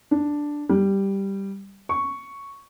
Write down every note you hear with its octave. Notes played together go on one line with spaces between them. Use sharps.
D4
G3
C#6